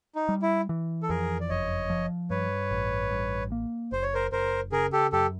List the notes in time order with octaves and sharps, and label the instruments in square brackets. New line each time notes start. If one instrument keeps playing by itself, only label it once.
[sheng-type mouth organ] D#4
[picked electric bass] G3
[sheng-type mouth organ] E4
[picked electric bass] E3
[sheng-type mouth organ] A4
[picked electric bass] F2 [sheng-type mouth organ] G#4 A#4
[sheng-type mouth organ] D5
[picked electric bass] F#1 [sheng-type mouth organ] C#5 D#5
[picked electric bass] F3
[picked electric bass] G2 [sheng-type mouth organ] B4 C#5
[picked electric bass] A1
G2
A#3
[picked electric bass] F#1 [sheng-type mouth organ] C5
[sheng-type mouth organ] C#5
A#4 C5
[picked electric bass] F#1 [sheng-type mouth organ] A#4 C5
[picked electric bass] C#3 [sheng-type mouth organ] G#4 A#4
[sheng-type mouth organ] G4 A4
[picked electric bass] F#2 [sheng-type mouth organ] G4 A4